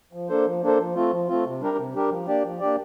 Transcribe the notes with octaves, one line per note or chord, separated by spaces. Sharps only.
F3
A#3 D4 A4 C5
F3
A#3 D4 A4 C5
F3
A3 C4 F4
F3
A3 C4 F4
C3
G3 D4 G4 A#4
C3
G3 D4 G4 A#4
F3
A#3 D4 G4 D5
F3
A#3 D4 G4 D5